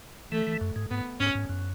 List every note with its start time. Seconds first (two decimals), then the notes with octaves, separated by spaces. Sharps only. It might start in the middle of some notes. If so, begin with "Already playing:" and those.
0.32 E3 A3
0.47 E3
0.61 F#2
0.76 G#2
0.91 G#2 B3
1.20 G#2 C#4
1.35 G#2
1.49 F#2